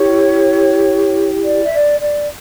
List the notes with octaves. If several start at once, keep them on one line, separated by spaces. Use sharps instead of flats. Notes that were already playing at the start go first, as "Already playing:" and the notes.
Already playing: E4 G4 C#5
D5
E5
D5
D5